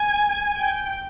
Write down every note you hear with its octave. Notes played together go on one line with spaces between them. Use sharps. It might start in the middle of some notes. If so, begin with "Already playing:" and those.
Already playing: G#5
G5